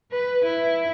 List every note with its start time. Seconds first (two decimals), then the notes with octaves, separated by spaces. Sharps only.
0.12 B4
0.45 E4